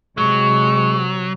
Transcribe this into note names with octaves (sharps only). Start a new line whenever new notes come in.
C3 F#3 G#3 C#6